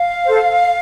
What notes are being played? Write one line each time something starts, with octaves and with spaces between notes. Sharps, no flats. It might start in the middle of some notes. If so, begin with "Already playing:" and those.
Already playing: F5
A4 C5